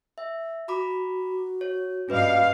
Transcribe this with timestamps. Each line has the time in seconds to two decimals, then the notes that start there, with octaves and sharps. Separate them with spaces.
0.18 E5
0.68 F#4 A#5 B5 D6
1.61 C#5
2.09 G2 C#4 B4 D#5 F5